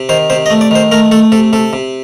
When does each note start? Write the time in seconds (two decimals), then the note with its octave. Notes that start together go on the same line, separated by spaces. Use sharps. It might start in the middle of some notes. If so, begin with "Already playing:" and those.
Already playing: C3
0.09 D#3 C5
0.30 C3 C5
0.46 D#5
0.50 A3
0.61 D5
0.71 D#3 C5
0.91 A3 A#4
1.11 A3 A4
1.32 C3 A4
1.53 C3 A4
1.73 C3